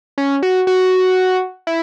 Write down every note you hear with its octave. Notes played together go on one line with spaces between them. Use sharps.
C#4
F#4
F#4
E4